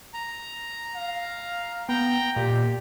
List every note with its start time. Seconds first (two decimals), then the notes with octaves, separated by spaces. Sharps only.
0.14 A#5
0.95 F5
1.89 B3 G5 A#5
2.36 A#2 G4 D5